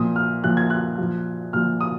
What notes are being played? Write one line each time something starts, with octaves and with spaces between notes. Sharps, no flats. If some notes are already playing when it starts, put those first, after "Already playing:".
Already playing: A#2 F3 D#6
F6
A#2 F3 F#6
G#6
F#6
A#2 F3
A#2 F3 F6
D#6